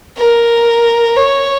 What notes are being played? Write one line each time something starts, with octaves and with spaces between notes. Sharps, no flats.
A#4
C#5